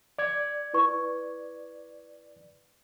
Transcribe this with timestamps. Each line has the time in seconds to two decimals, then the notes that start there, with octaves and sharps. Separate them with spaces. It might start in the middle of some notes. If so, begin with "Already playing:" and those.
0.19 D5 G#6
0.73 E4 B4 C#6